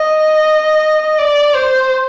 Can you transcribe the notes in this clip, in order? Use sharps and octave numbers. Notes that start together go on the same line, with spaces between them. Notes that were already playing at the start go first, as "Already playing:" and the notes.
Already playing: D#5
D5
C5